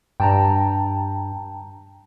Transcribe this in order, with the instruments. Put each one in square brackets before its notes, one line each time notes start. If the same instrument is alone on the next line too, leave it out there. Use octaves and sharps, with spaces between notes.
[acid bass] G2 [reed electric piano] G5 A5 A#5